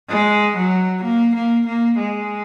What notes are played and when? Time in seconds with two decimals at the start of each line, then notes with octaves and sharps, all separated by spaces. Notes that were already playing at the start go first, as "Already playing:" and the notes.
0.08 G#3
0.56 F#3
1.03 A#3
1.35 A#3
1.66 A#3
1.97 G#3